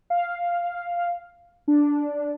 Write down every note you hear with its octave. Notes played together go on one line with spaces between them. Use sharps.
F5
D4